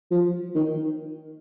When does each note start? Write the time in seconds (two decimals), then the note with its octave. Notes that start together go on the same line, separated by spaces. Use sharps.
0.11 F3
0.55 D#3